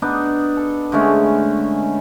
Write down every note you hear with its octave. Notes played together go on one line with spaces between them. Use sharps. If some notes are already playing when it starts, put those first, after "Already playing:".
B3 D4 D#4
A4
D3 G#3 A3 C#4